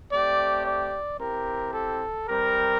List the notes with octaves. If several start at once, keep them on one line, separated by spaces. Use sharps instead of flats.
A3 C4 G4 D5
D5
C4 E4 G4 A#4
A4
G3 C4 G4 A#4